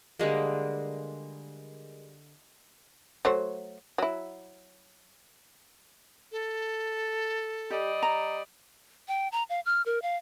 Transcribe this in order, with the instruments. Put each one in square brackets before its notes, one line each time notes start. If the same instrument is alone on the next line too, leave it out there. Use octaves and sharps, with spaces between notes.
[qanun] D3 G3 G#3 A#3
[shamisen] F#3 A3 C5
F#3 E4
[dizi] A4
[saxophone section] G3 D5 D#5 [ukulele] G4
[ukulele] A#5
[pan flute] G5
A#5
F5
F6
A#4
F5